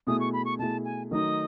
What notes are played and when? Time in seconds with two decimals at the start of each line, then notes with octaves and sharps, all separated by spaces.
0.07 B2 A3 E4 G#4 D#6
0.20 C#6
0.33 B5
0.45 C#6
0.59 B2 A3 E4 G#4 A5
0.85 G#5
1.11 D#3 F#3 A3 D#4 D#5